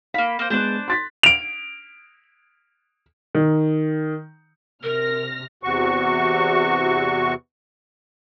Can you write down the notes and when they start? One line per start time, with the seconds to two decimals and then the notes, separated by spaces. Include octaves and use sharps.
0.14 A#3 F5 B5
0.39 A#3 C5
0.50 G#3 B3 D4 C5 F#6
0.88 C6 A6 B6
1.23 D7 F7
3.35 D#3
4.84 C3 A#4 F6 A#6
5.63 E2 C3 F#4 C#6